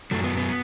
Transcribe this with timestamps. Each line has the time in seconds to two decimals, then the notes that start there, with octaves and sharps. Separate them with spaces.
0.11 F#2 F#3 A3
0.24 B3
0.37 B3